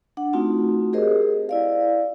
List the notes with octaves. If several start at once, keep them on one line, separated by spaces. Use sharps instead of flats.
D4 F#5
A3 C4 D#4 F4 F#4
G4 G#4 A#4 C5 D#5
E4 D5 F5